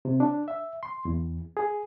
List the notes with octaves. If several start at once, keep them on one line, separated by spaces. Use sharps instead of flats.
C3
D4
E5
C6
E2
G#4